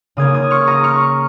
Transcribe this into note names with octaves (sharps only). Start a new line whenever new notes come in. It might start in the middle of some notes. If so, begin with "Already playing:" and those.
C#3 A#3 C#4 D#6 G#6
D#6 G#6
C#6 F6
A#5 D#6
C#6 F6